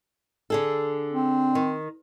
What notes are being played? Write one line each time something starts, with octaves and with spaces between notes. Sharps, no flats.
D3 G#4 A4
C4
D#3